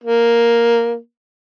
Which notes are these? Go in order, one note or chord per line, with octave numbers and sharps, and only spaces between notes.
A#3